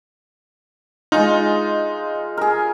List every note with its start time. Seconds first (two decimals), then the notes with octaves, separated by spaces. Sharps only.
1.12 G#3 D#4 F4
2.37 G#4 A#4